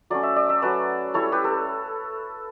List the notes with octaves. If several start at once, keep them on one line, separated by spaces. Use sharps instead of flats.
F#3 A3 C#4 D5
E5
D5
E5
F#3 A3 C#4 B4 D5
G3 C#4 E4 A4 C#5
G4 B4
A4